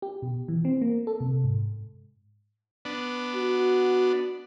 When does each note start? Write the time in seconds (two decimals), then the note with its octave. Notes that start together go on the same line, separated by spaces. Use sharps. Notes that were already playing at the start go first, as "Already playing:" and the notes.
0.02 G4
0.22 B2
0.48 E3
0.65 C4
0.81 A#3
1.07 A4
1.20 C3
1.44 G#2
2.85 B3 D4
3.35 F#4